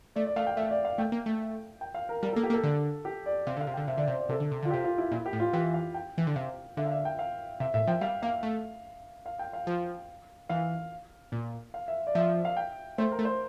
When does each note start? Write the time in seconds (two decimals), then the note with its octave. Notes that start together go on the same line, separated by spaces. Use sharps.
0.16 A3 D5
0.26 D5
0.36 A3 F5
0.47 G5
0.56 A3 E5
0.71 D5
0.85 F5
0.98 A3 G5
1.12 A#3
1.26 A3
1.81 G5
1.94 F5
2.09 A#4
2.22 G3 A#4
2.33 A#3 A4
2.43 G4
2.50 A#3
2.54 A4
2.64 D3
3.05 G4
3.26 D5
3.47 C3 F5
3.57 D3 F5
3.67 C3
3.74 D3 G5
3.88 C3 E5
3.98 D3 D5
4.08 C3 C5
4.19 D5
4.29 C3 A4
4.40 D3
4.51 C3
4.63 D3 F4
4.71 C3 G4
4.84 F4
4.98 E4
5.12 A#2 E4
5.26 G4
5.33 A2
5.40 F4
5.53 E3 G4
5.74 F5
5.94 G5
6.18 E3
6.27 D3
6.36 C3 F5
6.77 D3 E5
6.85 F5
6.92 E5
7.05 G5
7.19 F5
7.60 C3 E5
7.74 A2 E5
7.87 F3 G5
8.01 G3 F5
8.22 A#3 F5
8.43 A3
9.26 F5
9.39 G5
9.53 F5
9.67 F3
10.49 E3 F5
11.32 A#2
11.74 F5
11.88 E5
12.07 D5
12.15 F3 E5
12.45 F5
12.57 G5
12.98 A3 C5
13.12 A#4
13.19 A3
13.25 C5